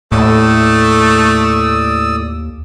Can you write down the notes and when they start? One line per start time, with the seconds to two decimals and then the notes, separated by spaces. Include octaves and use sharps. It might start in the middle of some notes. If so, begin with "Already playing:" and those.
0.12 D#2 A2 A3 D5 D#6 E6